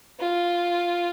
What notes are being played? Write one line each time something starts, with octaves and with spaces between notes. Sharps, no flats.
F4